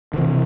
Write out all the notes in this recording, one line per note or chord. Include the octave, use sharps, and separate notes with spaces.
D3
C3 E3